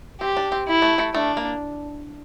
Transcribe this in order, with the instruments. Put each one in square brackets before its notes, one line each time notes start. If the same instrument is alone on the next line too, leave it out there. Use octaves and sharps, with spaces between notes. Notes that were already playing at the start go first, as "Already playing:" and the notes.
[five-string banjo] C4 [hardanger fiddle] G4
[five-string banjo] D4
C4
[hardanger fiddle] E4
[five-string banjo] A3
A3
[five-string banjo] A3 [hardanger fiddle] D4
[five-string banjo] A#3